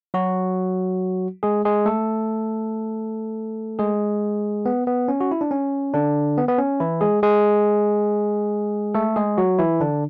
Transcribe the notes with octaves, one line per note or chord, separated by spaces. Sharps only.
F#3 F#4
G#3 G#4
G#3 G#4
A3 A4
G#3 G#4
B3
B3
C#4
F#4
E4
D4
C#4
D3 D4
B3
B3
C#4
E3 E4
G#3 G#4
G#3 G#4
A3 A4
G#3 G#4
F#3 F#4
E3 E4
D3 D4